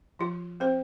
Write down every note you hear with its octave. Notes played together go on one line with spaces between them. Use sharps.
F3 F4
C4 C5